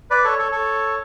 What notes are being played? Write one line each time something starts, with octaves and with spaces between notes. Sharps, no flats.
B4 D5
A4 C#5
A4 C#5
A4 C#5